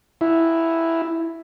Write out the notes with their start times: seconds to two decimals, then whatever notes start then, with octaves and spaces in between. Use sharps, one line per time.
0.21 E4